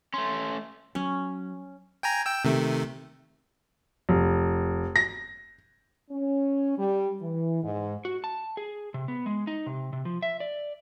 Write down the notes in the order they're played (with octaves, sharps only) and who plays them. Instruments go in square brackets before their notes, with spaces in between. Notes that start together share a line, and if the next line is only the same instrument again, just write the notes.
[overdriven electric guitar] A3 C#4 [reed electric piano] C6
[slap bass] F#3 [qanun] C#4
[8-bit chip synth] G5 G#5 A#5
G5 E6
C3 D#3 A3
[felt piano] F1
A#6
[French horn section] C#4
G3
E3
G#2
[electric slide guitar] F#4
A5
G#4
C3
B3
G#3
D#4
C3
C3
F3
E5
D5